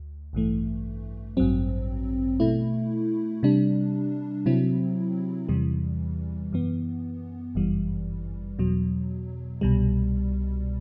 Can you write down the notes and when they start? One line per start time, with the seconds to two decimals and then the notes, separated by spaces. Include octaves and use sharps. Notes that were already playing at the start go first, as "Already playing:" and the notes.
Already playing: D2
0.33 A1 G2 E3 A3
1.37 A1 G2 F#3 C4
2.40 B2 A3 E4
3.43 C3 G3 D4
4.46 C3 F#3 C4 E4
5.48 E2 C3 E3 G3
6.53 F#2 E3 B3
7.55 G1 F#2 E3 G3
8.59 E2 B2 F#3
9.61 C2 B2 G3